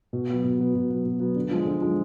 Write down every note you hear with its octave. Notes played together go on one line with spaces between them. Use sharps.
B2
F#3 B3
B2
F#3 B3
B2
F#3 B3
B2
F#3 B3
D3
F3 G#3
D3
F3 G#3